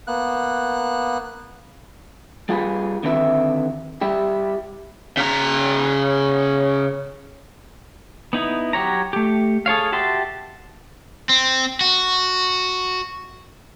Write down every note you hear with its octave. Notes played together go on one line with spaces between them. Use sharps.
A#3 B3 F#6
G3 F4 G#4 A#4 B4
D3 D#3 C4 E4 B4 E5
G3 E4 G4
C#3 A#5
B3 D#4 E4
F#3 G4 C#5 A#5
A3 G4
G#4 A4 C#5 F5
F#4 G4 E5 A5 C6
C4
F#4